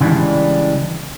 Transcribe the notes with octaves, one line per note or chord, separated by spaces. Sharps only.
C#3 E3 G3 G#3 D4